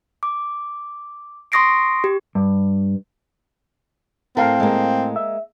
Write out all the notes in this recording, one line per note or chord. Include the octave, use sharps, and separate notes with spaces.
D6
C6 C#6 D#6 A#6 C7 D7
G4
G2
A2 C4 A4 A#4 F5
G#3 A#3
E5